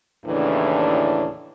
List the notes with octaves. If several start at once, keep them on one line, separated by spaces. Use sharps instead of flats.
D#2 A2 C#3 E3 D4